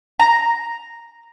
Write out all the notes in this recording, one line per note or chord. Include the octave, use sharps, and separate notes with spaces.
A#5